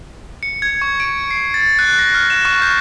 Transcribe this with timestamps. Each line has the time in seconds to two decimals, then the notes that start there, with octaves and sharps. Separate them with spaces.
0.43 C#7
0.62 G#6
0.82 C#6
1.00 D7
1.31 C7
1.54 A6
1.79 F#6
1.99 A#6
2.15 F6
2.30 E7
2.45 C#6
2.62 G6